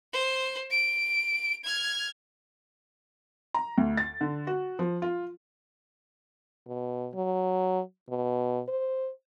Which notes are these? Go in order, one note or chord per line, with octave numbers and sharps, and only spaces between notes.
C5
D7
F6 G#6
A#5
D2
A6
D3
F#4
F3
F4
B2
F#3
B2
C5